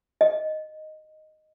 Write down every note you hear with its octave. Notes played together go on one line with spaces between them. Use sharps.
D#5